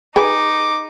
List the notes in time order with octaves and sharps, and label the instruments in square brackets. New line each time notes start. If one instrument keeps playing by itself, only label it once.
[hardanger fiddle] D#4 [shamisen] G#4 B4 G#5 [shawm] D6